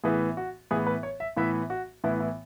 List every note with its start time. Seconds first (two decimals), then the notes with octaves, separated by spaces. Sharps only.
0.04 A2 E3 B3 G#4
0.37 F#4
0.71 A2 E3 B3 G#4
0.87 B4
1.03 C#5
1.20 E5
1.37 A2 E3 B3 E5
1.70 F#4
2.04 A2 E3 B3 E4
2.20 E4